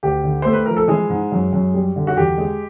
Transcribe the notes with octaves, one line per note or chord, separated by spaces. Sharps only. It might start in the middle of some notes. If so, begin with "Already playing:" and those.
D2 G4
D3
A3 C5
B4
F3 A#4
A4
E3 G#3 G#4
G#2
F#2
F#2
G3
D3
F#4
E2 G4
G#3